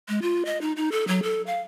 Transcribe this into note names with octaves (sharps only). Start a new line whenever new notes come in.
G#3
F4
D#5
D#4
D#4
A4
F#3
A4
F5